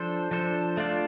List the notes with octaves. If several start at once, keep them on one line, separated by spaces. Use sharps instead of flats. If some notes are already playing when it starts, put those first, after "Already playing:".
Already playing: F3 D4 A4 C5
F3 D4 A4 C5
A3 D4 F4 D5